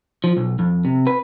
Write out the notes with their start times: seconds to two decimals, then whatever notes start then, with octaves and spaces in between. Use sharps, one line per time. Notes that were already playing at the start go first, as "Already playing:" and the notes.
0.24 F3
0.37 B1
0.59 F2
0.85 C3
1.07 B4